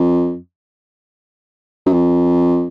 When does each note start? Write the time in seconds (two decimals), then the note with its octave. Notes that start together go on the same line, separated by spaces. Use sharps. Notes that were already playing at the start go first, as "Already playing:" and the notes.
Already playing: F2
1.86 F#2
1.92 F2